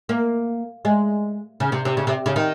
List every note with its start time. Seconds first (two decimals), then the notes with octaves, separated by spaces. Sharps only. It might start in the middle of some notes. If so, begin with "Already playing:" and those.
0.09 A#3
0.85 G#3
1.60 C#3
1.72 C3
1.85 C3
1.97 C#3
2.07 C3
2.26 C#3
2.36 D#3